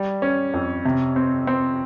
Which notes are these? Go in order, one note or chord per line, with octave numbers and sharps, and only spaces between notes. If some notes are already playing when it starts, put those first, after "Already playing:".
Already playing: G3
C#4
F2
C3
C4
C4